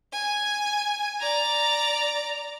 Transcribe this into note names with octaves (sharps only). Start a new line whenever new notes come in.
G#5
D5 A#5